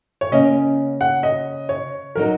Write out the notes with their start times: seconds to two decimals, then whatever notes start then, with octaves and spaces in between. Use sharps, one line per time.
0.21 C#5
0.32 C#3 A#3 C#4 D#5
1.01 F#5
1.23 D#5
1.69 C#5
2.16 F#3 D#4 A#4